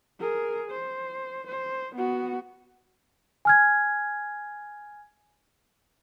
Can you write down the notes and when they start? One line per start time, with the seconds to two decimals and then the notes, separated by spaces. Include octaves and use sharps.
0.19 G#4 A#4
0.71 C5
1.46 C5
1.95 B3 F#4
3.45 G#5 F6 G#6